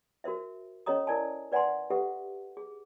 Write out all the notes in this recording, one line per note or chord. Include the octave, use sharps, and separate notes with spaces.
F#4 A#4 C5 E5
C#4 A4 C#5 D#5 A#5 D#6
E4 A#4 D5 G#5 A5
B4 D5 F#5 G#5 A#5 C6
G4 A4 B4 E5 F#5
G#4